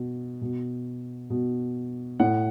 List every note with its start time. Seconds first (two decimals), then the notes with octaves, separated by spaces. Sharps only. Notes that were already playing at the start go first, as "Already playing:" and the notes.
Already playing: B2
0.42 B2
1.30 B2
2.20 A2 F#5